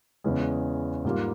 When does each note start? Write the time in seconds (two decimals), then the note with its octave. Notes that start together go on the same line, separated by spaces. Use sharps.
0.24 E2 C#3 E3 G#3 C#4
1.05 G#2 G3 A#3 F4